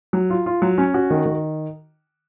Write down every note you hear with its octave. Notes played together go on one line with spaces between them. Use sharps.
F#3
F4
F4
F#3
C#4
F#4
D#3
D#3